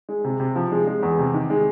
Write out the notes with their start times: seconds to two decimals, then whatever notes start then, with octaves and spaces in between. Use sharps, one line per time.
0.09 G#3
0.24 C3
0.40 C3
0.56 F3
0.72 G#3
0.87 G#3
1.03 E2
1.19 C3
1.34 D#3
1.50 G#3